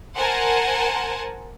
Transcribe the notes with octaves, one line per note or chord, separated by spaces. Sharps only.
A#4 C5 F#5 G#5 A5